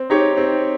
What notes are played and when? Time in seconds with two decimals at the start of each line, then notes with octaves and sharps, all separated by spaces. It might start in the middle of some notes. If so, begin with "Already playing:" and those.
Already playing: C4
0.10 D#4 G4 C#5
0.37 C4